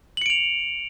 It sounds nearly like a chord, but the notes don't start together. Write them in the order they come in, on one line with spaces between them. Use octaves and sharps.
F#7 C#7 D7 F7